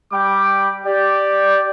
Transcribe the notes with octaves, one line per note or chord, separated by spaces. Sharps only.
G3 G5 B5 D6
G4 D5